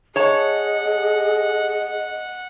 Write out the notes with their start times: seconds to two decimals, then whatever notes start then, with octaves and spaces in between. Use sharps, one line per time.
0.16 G#4 C#5 D#5 F#5 A5